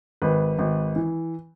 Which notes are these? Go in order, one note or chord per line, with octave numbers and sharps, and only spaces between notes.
G#1 B4
G#1
E3